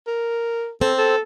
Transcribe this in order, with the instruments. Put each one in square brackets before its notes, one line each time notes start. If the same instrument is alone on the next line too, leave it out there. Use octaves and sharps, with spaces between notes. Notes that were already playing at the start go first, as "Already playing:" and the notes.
[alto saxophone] A#4
[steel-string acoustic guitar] C4 [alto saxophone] A4
[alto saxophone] A4